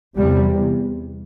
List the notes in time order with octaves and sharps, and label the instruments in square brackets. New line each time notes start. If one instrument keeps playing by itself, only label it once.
[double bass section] E2 C3 G3